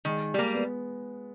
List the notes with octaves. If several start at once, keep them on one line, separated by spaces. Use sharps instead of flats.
D#3 G#3
G3 A#3
B3